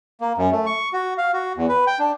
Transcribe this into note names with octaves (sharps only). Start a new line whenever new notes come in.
A#3
F#2
A3
C#6
F#4
F5
F#4
E2
B4
G5
D4